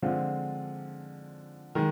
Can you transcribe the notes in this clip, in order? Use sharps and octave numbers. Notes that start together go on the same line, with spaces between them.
D3 F3 G#3 C4 F4
D#3 G#3